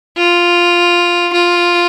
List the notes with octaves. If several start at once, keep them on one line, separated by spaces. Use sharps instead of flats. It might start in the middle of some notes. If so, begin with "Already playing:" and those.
F4
F4